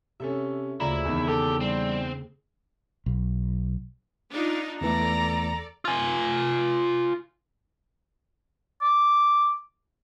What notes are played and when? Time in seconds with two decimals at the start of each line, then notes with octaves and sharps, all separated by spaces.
0.20 C3 C#4 A4 E5
0.80 D2 C#3 G#3 A#3 E4 F4 D5 A#5
1.05 E2 D#3
1.28 G4 A4
1.61 G3 C4
3.06 B1
4.31 D4 D#4 F4
4.81 E2 E3 A3 A4 D5 A#5
5.85 F4 G#5
8.82 D6